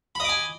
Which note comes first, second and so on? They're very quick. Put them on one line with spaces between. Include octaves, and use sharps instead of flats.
B5 D#5 D6 G#5